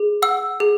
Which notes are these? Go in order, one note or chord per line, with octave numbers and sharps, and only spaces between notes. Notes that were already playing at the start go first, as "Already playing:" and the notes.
Already playing: G#4
F#5 E6
G#4